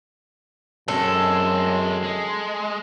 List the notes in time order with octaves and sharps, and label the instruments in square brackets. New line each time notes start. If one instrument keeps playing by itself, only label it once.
[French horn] F#2 [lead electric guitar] G#3 C4 [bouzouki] A4
[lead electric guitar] G#3